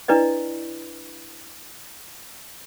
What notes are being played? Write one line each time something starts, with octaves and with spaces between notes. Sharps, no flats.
D4 E4 B4 D5 D#5